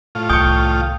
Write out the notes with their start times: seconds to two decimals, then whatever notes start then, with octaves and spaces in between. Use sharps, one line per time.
0.15 A2 F4
0.29 C2 D#3 G5 C#6 D#6